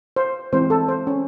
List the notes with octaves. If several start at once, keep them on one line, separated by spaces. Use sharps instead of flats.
C5
E3 G#3 C4 C5
A4
C5
C#4